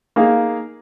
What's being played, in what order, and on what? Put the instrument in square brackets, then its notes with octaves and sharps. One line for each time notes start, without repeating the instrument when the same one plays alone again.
[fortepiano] A#3 D#4 G#4 F5